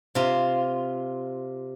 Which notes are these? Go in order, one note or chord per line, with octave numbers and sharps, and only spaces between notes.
C3 F4